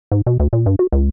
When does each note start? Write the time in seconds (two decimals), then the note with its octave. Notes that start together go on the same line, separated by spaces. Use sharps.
0.12 G#2
0.27 B2
0.40 D2
0.53 A#2
0.66 G2
0.79 F#4
0.92 C#2